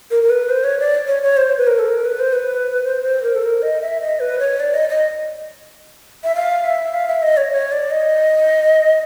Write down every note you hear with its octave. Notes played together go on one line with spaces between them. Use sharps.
A#4
A#4
B4
C5
C#5
D5
C#5
C#5
C5
B4
A#4
A4
A#4
B4
C5
B4
C5
C5
A#4
A4
A#4
D#5
E5
D#5
B4
C#5
D5
D#5
D#5
E5
F5
E5
F5
E5
D#5
C#5
C#5
D5
D#5